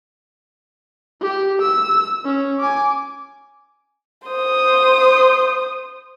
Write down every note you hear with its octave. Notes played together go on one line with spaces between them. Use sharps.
G4
E6
C#4
G#5 D6
C5 D#6